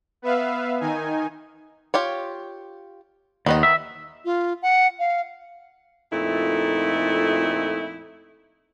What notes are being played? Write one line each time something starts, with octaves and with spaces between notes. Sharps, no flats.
B3 B4 E5 F5
D#3 D#4 G#5
F4 G4 C#5
D#2 D#3 B3 D#5
E5
F4
F#5
F5
F2 A#2 A3 D#4 E4